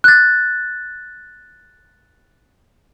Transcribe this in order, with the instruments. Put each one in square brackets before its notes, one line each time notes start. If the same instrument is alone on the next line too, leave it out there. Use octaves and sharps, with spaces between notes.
[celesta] F#6 A6